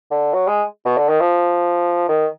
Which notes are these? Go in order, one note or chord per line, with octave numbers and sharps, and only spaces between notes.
D3
F#3
G#3
B2
D3
D#3
F3
D#3